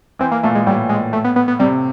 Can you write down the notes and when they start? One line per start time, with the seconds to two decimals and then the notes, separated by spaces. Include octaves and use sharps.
0.19 E3 C4
0.32 A#3
0.43 A#2 A3
0.55 G#3
0.66 A2 G3
0.89 G#3
1.13 A3
1.24 B3
1.36 B3
1.48 B3
1.59 C3 G3